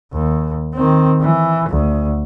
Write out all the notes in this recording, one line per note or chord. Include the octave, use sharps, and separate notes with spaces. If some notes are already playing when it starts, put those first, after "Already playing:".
D#2
D#3 C4
E3
D2